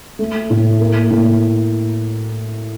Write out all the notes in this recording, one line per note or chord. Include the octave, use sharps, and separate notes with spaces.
A3
A2
A#3
A2